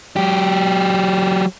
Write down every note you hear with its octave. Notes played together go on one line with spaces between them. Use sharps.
F#3 G4